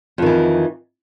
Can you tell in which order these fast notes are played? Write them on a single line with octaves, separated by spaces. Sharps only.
F2 D#3 E3